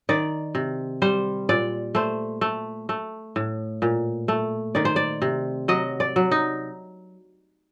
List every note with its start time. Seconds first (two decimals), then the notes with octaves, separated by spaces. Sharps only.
0.09 D#3 D5
0.55 C3
1.02 G3 C5
1.49 A#2 D5
1.95 A3 C5
2.41 A3
2.89 A3
3.36 A2
3.82 A#2
4.28 A3
4.75 D#3 D5
4.85 C5
4.96 D5
5.22 C3
5.68 F#3 D#5
6.00 D5
6.16 F#3
6.32 D#4